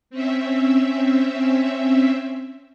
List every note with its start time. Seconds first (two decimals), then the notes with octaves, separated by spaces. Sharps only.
0.10 C4 C#4 E5